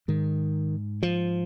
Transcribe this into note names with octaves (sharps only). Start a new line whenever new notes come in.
G#2 D#3
F3